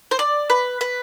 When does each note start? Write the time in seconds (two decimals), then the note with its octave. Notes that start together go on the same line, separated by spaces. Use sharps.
0.11 C5
0.19 D5
0.50 B4
0.81 B4